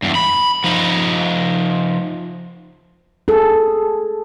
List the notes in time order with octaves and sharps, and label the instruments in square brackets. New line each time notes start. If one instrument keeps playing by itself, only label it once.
[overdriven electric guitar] E2 G2
B5
F3 D#4
[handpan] G#4 A4